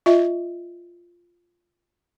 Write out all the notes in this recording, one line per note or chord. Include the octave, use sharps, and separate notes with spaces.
F4 D#5 E5